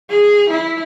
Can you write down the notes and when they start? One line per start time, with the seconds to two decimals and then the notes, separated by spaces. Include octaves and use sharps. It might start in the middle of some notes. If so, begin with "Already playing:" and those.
0.10 G#4
0.50 E4